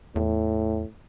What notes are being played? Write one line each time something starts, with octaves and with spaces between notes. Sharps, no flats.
E2 A2